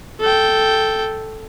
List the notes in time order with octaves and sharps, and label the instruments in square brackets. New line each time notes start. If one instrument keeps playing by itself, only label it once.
[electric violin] A4 G5